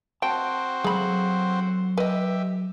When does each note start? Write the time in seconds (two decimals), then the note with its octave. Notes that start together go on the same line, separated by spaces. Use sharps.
0.22 C4 F#4 C5 G5 A5
0.84 F#3 G#4 A4 F5 B5
1.98 G4 B4 D#5 E5